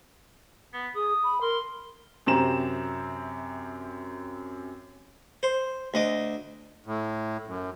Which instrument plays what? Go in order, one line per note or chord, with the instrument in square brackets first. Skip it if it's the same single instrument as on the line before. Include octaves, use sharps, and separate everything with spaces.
[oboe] B3
[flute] G#4 [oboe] D#6
[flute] B5
[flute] A#4 [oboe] C6
[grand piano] F#2 C3 C4 A#5 E7
[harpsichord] C5
D2 D#5 D6
[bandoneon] A2
F#2